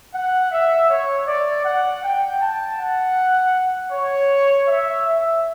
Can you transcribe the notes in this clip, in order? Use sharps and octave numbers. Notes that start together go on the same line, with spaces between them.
F#5
E5
C#5
D5
F#5
G5
A5
F#5
C#5
E5
E5